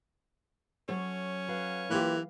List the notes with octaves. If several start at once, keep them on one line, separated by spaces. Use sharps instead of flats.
F#3 C#4 A4 C#5
F#3 B4 F5
E3 A#3 F4 G4